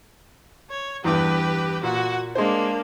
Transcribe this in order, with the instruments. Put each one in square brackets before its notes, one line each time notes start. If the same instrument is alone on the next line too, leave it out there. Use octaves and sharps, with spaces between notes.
[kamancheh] C#5
[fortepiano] E2 G2 D6 [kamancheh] G4 B4
[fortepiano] A#2 [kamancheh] F#4 F#5
[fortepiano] G#3 C5 [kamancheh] A#3 D4